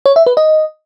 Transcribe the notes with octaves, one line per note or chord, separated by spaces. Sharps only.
C#5
E5
B4
D#5